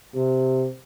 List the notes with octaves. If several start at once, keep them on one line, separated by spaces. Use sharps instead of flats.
C3